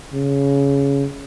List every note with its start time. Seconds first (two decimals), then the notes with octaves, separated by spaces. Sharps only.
0.13 C#3